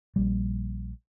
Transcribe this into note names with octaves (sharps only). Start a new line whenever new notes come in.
A#1 A#2 G3